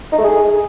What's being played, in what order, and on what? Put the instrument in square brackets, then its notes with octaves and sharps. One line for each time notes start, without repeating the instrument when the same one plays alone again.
[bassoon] D#4
A3
G#4